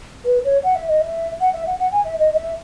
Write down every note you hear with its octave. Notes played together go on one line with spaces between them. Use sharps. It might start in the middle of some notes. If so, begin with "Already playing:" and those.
B4
C#5
F#5
E5
D#5
E5
F#5
E5
F#5
F#5
G#5
E5
D#5
D#5
E5